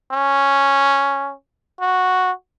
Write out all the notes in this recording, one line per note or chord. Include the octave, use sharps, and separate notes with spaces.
C#4
F#4